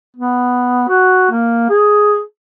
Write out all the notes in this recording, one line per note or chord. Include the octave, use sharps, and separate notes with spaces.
B3
F#4
A#3
G#4